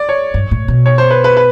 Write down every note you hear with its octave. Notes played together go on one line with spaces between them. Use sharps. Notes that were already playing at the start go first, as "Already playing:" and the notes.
Already playing: D5
C#5
G2
A2
B2
C#5
C5
B4
B4
B4